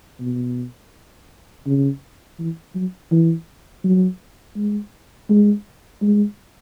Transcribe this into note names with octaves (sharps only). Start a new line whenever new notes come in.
B2
C#3
E3
F#3
E3
F#3
G#3
G#3
G#3